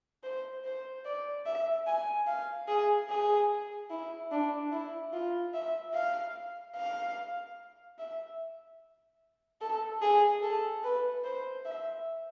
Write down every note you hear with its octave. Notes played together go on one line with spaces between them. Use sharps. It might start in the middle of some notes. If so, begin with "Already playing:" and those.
C5
C5
D5
E5
G#5
F5
G#4
G#4
E4
D4
E4
F4
E5
F5
F5
E5
A4
G#4
A4
B4
C5
E5